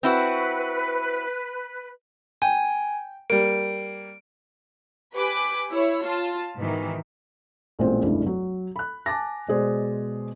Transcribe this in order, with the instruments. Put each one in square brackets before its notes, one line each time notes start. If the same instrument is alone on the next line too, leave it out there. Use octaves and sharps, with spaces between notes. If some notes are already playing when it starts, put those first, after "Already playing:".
[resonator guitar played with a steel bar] C4 E4 F#4 [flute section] B4
[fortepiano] G5 [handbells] G#5
[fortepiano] G3 A#3 [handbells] D7
[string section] G4 B4 G#5 B5 D6
E4 C#5
F4 A5
G#2 B2 D#3 E3
[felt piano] A1 A#2 G#3 C4 C5
F1 C#2 G2 E3
F#3
B5 F#6
G#5 A5 D6 A6 A#6
B2 G#3 G#4 C5 D5